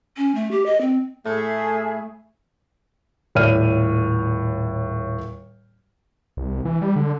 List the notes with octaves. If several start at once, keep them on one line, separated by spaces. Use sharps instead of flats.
C#4
A3
G4
D#5
C4
A2 A3 G#4 A4 E5
D#1 A2 C#5 D5 F6 D#7
C2
E3
G3
D3